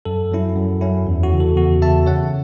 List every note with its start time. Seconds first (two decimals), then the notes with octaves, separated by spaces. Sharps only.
0.05 F#2 A4
0.32 F#3 C#4 E4
0.56 F#2
0.81 F#3 C#4 E4
1.07 E2
1.23 F#4
1.32 C#3 E3
1.40 A4
1.57 E2 F#4
1.82 E3 E5 A5
1.87 C#3
2.07 C#3 C#5 F#5